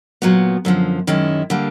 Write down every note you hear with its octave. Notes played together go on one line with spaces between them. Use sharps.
A#2 F#3 B3
F#2 D3 F3
F#2 D#3 G#3 C#4 E4
D3 G3 A#3